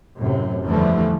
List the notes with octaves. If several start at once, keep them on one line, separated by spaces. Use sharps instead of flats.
F#2 A2 C3
E2 D3 E3 F3 G3 A3